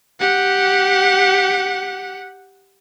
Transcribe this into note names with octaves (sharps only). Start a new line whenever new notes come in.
G4 F#5